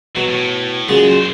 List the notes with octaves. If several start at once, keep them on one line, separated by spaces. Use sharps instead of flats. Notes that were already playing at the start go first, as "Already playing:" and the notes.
B2 F#3
A2
A#2 C#3 F#3 G#3
B1 C5